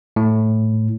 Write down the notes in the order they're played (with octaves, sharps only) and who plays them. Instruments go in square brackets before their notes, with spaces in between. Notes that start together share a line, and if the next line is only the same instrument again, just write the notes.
[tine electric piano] A2